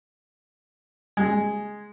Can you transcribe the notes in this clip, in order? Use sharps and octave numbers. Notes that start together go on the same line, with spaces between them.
G#3